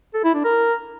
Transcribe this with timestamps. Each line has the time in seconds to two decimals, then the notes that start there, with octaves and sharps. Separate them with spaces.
0.14 A4
0.24 E4
0.34 D4
0.44 A#4